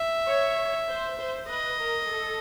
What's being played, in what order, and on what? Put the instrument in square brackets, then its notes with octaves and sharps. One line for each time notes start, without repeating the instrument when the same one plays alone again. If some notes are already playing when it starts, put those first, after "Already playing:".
Already playing: [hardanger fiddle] E5
[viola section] C#5
C5
C5
[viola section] B4 [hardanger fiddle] D#5
[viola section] A#4
A4